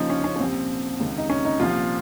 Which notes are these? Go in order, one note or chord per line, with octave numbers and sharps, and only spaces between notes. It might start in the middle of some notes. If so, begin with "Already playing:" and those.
Already playing: D#2 C#3 F3 D#4
C#4
C#4
C#4
C2 A#2 F3 C4
C#2 C3 D#3
D#4
C#4
D#4
C2 A#2 F3 F4